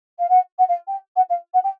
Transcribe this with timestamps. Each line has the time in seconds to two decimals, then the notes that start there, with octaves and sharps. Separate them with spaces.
0.19 F5
0.29 F#5
0.58 F#5
0.68 F5
0.87 G5
1.16 F#5
1.29 F5
1.54 F#5
1.64 G5